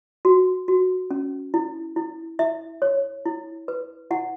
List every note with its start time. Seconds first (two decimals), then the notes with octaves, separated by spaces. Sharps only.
0.25 F#4
0.68 F#4
1.11 C#4
1.54 E4
1.96 E4
2.39 E4 E5
2.82 C#5
3.26 E4
3.68 B4
4.11 E4 F#5